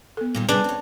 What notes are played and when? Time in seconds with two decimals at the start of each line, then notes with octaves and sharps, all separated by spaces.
0.17 B3 A4
0.35 A#2 D#3 G3
0.49 C3 G3 D4 G#4 B4
0.64 C4 C#5